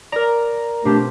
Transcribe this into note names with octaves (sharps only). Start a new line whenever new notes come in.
A#4 D5 A#5
B2 A3 C4 D4 F4 G4